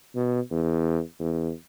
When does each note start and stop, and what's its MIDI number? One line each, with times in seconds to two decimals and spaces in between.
0.15 0.40 47
0.51 1.00 40
1.19 1.51 40